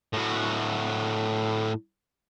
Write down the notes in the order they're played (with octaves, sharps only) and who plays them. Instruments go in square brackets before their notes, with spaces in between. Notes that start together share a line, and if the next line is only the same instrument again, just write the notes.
[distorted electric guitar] A2 F#4